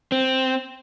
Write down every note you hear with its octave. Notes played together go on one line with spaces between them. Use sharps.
C4